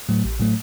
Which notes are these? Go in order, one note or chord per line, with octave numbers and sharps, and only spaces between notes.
A2 F#3 A3
A1
A2 F#3 A3